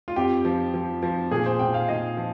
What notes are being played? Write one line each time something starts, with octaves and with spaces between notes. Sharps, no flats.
F4
F2 G4
F3
F3
F3
A#2 G#4
C5
A#2 G5
F5
A#2 D#5
F3